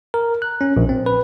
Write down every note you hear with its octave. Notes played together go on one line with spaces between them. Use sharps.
A#4
F#6
C#4
A#1
C4
B4